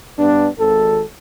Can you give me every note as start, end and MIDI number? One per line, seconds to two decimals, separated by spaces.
0.18 0.49 43
0.18 0.49 59
0.18 0.49 62
0.59 1.04 32
0.59 1.04 69